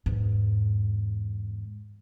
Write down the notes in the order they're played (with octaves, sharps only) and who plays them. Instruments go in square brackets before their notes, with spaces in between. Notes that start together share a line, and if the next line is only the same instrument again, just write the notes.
[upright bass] E2 G#2